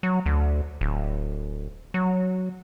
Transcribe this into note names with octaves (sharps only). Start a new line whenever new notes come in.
F#3
D2
D1
F#3